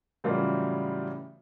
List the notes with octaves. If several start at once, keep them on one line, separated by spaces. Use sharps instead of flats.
A2 C#3 E3 F#3 G3 F4